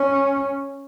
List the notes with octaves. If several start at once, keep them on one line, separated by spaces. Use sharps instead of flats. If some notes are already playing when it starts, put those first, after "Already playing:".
Already playing: C#4